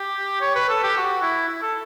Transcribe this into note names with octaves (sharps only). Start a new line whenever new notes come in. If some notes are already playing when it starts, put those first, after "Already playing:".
Already playing: G4
C#5
B4
A4
G4
F#4
E4
E4
A4